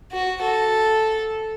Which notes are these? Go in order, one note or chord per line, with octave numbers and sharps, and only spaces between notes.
F#4
A4